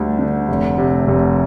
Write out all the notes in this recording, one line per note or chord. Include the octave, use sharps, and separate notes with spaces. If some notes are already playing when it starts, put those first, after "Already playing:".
Already playing: D2 G3 D4
D3
F1
C3
F1